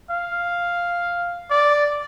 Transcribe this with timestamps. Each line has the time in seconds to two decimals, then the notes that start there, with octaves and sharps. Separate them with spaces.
0.10 F5
1.50 D5